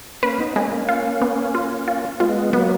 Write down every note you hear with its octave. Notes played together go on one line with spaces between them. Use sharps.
A#3 C#4 B4
B3 D#4
G#3 A#3 C#4
A#3 C#4
F4
B3
F4
F4
G#3 B3 F4
F#3 A#3 B3